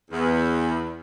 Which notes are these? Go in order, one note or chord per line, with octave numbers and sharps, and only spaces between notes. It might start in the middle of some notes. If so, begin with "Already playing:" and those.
E2